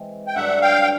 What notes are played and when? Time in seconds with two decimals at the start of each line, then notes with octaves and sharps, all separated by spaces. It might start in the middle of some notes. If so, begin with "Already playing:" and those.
Already playing: E3 G#3 C4
0.27 G5
0.35 G2 D3 F#3 E5 F#5
0.62 F5 G5
0.82 G5